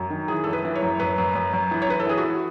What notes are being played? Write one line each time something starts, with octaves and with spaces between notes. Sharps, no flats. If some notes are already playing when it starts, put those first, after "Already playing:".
Already playing: F#2 F#4
D#3
E3 G#4
A4
F#2
B4
E3
C#5
F#2
F#2 B4
F#2
F#2
F#2
E3
C#5
E3 B4
A4
E3 G#4
F#4
E3